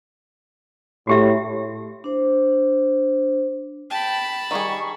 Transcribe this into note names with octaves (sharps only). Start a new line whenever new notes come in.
A2 F#4 G4 E5
D4 C5
G5 A5 B5
D#3 G3 G#4 C#6